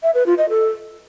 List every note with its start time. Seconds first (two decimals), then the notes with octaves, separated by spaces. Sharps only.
0.03 E5
0.14 B4
0.26 F4
0.38 D#5
0.50 A4